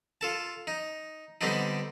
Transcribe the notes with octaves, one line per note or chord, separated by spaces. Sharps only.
F4 A4 A5
D#4
D3 G3 B3 C4 D4 D#4